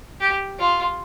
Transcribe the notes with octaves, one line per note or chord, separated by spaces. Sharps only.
G4
F4